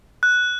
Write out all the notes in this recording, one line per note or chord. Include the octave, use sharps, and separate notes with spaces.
F#6